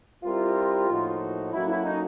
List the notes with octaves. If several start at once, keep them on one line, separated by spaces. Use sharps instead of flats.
G3 C4 E4 F4 G4 A#4
A2 F3 A#3 D#4 F#4
F#3 A#3 C#4 E4 F#4 A4
E4
D#4